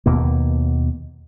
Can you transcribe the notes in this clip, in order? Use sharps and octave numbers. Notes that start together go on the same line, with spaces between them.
D#2 B2 A#3